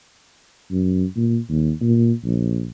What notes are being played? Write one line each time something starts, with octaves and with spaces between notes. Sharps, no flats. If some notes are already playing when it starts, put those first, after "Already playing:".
F#2
A#2
D#2
A#2
A#1